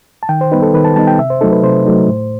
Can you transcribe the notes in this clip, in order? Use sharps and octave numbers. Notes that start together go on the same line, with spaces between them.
A5
D#3 G5
C5
G3 B3 D#4 B4
A4
D#3 B4
A5
G3 B3 D#4 A5
G5
C3 E5
C5
F#3 A3 D#4 A4
B4
C3 C5
F#3 A3 D#4
A2